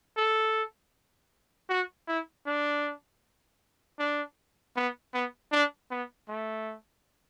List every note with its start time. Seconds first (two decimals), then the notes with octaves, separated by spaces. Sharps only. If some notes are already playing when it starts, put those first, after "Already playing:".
0.17 A4
1.70 F#4
2.08 E4
2.46 D4
3.99 D4
4.76 B3
5.14 B3
5.52 D4
5.91 B3
6.29 A3